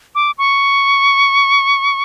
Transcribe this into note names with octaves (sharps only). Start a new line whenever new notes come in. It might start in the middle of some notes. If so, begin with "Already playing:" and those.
D6
C#6